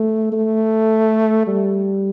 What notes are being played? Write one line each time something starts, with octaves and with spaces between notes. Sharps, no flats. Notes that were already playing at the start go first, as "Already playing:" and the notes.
Already playing: A3
A3
G3